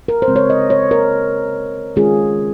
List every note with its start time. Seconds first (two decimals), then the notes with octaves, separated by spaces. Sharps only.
0.08 A#4
0.22 C5
0.28 C#3 G#3 C4
0.36 C#5
0.50 D#5
0.70 C#5
0.91 A#4
1.96 D#3 G#3 C#4 F4 G#4